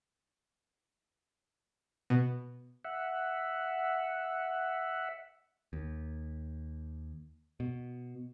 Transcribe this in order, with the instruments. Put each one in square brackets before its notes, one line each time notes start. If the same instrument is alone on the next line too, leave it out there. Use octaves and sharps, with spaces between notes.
[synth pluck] B2
[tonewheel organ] E5 F#5
[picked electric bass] D#2
B2